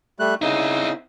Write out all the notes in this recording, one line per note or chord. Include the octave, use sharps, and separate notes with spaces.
G3 A3 F#6
C#3 C4 D#4 E4